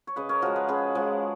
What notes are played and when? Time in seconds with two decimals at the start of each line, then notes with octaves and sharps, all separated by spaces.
0.07 C#5
0.16 C#3 B4 D#5
0.29 A#4 C#5
0.42 F3 G#3 F#4 A#4
0.56 G#4 B4
0.68 C#3 G#4 B4
0.95 F3 G#3